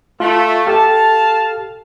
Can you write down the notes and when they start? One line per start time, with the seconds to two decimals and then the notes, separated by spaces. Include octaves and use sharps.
0.20 A3 F4 F5
0.67 G4 A4 F5 A5